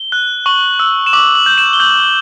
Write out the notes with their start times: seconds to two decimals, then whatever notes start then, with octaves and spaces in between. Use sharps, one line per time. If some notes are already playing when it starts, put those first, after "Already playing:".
Already playing: G7
0.12 F#6
0.46 C#6 F#7
0.79 E6
1.06 E7
1.13 D6 F#7
1.35 F#7
1.46 G6
1.58 E7
1.73 G7
1.80 G6 F#7